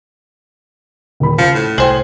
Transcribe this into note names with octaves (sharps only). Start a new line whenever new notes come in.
D#1 B5
C#3 F3 C#7
A2
C2 G#4 C5 G5 F#7